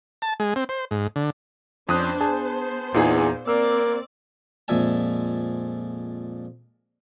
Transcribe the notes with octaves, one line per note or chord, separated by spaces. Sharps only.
A5
G#3
C4
C5
G#2
D3
F2 C#4 D4 C5 D#6 F#6
B3 G#4 C5 A5
E2 A#2 D#4 G#4
A#3 C4 D5 E6
F2 A#2 G#3 E5 G#5 A5